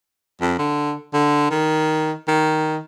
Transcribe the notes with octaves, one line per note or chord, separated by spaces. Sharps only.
F2
D3
D3
D#3
D#3